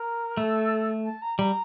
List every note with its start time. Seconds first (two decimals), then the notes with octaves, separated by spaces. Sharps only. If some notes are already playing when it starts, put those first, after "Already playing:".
Already playing: A#4
0.37 A3 A4
1.05 A5
1.22 A#5
1.38 G3 A#5